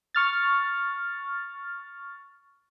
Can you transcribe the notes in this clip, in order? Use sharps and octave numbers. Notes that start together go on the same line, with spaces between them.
C#6 F6 A6